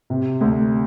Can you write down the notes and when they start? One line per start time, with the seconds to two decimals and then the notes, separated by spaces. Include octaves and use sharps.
0.10 C3
0.41 D2